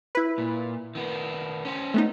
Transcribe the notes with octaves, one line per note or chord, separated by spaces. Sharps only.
E4 B4
A#2
D#3 B3
C#4 C5
A3 B3 D#4